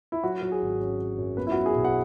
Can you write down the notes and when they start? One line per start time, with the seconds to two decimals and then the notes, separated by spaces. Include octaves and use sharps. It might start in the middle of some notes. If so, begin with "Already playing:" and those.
0.12 E4
0.23 F#3 F#4
0.42 F#3
0.52 G#4
0.62 G#1
0.81 C#4
0.99 C#4
1.18 F#2
1.37 B3 B4
1.47 E4
1.52 F#4
1.56 F#3
1.66 G#4
1.75 B1
1.85 F#5